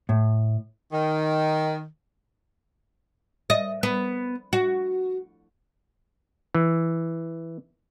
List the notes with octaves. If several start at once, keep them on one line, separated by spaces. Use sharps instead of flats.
A2
D#3
D#5
B3
F#4
E3